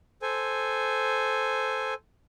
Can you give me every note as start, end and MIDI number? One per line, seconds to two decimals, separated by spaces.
0.22 1.94 69
0.22 1.94 72
0.22 1.94 80